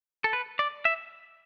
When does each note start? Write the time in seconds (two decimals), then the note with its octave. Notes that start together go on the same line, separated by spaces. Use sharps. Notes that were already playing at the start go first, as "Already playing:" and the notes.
0.24 A4
0.33 B4
0.59 D5
0.85 E5